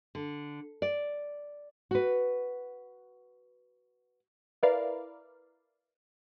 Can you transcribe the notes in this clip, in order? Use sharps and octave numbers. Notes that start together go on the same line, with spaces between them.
D3
D5
F#4 B4
E4 A#4 B4 D5 F5